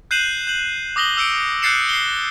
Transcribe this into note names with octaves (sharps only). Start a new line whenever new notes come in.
F#6 G6 C7 D#7 E7 F#7
G6 F#7
D6 D#6 A#6 F#7 G7
D6 E6 G6 C#7 D7
F#6 G6 A6 C7 C#7 E7
C7 G7